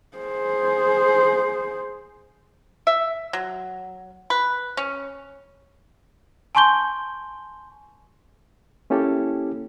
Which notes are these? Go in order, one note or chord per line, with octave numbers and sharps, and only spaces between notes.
G#4 C5
E5
F#3
B4
C#4
G#5 A5 C6 C#6 G6 G7
A#3 C#4 E4 G4 A4